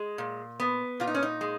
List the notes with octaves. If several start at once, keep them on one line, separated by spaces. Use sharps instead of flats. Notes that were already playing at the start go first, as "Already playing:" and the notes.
Already playing: G#3
A#2
B3
A#2 F4
D#4
C#4
D#4
G#3